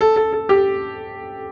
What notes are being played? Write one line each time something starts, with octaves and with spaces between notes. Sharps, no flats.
A4
A4
A4
G4